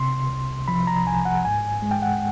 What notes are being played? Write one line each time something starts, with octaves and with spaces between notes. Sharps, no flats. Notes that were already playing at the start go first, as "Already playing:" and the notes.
Already playing: C3 C6
C2
F3 B5
A#5
C2 G#5
F#5
G#2 G#5
G#3
G5
F#5